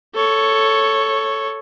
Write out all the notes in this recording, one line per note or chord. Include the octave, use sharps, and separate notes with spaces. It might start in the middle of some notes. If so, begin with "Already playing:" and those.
A4 C#5